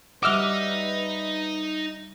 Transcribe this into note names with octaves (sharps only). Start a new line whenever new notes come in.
G3 D#4 B4 E5 F#5 D6 E6 F6